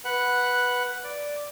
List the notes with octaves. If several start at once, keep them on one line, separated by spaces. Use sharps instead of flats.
B4 F#5 F#6
D5